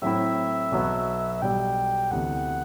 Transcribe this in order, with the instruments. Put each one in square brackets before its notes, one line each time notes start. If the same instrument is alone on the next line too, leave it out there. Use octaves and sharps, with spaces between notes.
[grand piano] A2 F#3 C4 E4 [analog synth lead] E5
[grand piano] B1 B2 F#3 B3
[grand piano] B1 B2 G3 [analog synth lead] G5
[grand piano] D2 C3 E3 B3 [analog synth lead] F#5